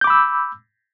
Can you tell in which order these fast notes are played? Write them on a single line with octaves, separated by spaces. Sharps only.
G6 D6 B5 E6